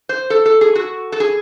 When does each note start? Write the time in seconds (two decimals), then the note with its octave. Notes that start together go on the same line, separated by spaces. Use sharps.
0.09 C5
0.30 A4
0.46 A4
0.61 G#4
0.75 F#4
1.12 A4
1.20 G#4